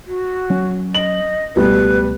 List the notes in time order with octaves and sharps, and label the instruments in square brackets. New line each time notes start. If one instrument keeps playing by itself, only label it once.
[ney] F#4
[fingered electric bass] F#3 C#4
[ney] D#5 [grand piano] F#7
[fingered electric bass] C#2 [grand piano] B2 G3 A3 [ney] B4